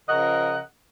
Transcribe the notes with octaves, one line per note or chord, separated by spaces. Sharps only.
C#3 F3 A#4 D#5 F#5